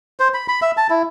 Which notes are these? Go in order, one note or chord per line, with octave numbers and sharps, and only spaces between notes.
C5
B5
B5
E5
A5
E4